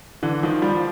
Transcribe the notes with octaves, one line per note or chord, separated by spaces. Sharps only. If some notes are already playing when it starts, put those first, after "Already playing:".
D3 E3
D#3 F3
F3 G3